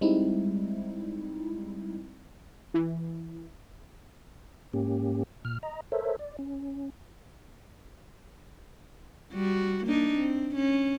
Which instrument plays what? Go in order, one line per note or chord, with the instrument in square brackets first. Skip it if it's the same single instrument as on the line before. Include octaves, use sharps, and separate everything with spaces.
[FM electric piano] G3 G#3 C4 D#4 E4
[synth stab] E3
[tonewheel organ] G#2 A#3 C#4 G4
A#2 F6
D#5 A#5
A4 A#4 C5 C#5 E5
D5
C#4
[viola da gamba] G3 F#4
A#3 D4 D#4
C4
C#4